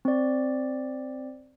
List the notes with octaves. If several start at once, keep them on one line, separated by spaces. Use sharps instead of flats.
C4 D5